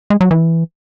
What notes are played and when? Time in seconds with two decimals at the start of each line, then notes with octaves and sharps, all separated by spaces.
0.10 G#3
0.21 F#3
0.31 E3